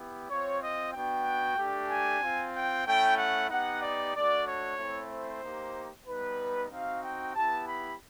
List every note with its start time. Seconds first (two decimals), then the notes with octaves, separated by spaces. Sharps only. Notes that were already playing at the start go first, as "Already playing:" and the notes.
Already playing: B3 E4 G4
0.29 C4 F4 C#5
0.62 D#5
0.94 B3 D4 F#4 G5
1.57 A3 D4 G4
1.89 G#5
2.21 C4 F4
2.54 G5
2.85 A3 C#4 E4 G5
3.17 F#5
3.50 B3 D#4 G4 F#5
3.82 D5
4.14 A3 D4 F#4 D5
4.47 C#5
4.78 A3 C4 E4
5.11 C5
5.43 A#3 D#4 G4
6.07 G3 B3 D#4 B4
6.70 C4 D#4 F#4 F5
7.03 G5
7.35 B3 E4 G4 A5
7.66 B5